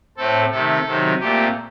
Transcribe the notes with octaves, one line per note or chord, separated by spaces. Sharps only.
A2 A3 C4 A4
C3 D#3 A3 C4 A4
C3 D#3 F#3 C4
A#2 A3 C4 G4